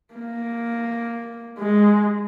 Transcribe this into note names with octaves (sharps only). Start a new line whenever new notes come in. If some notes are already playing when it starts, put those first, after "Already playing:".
A#3
G#3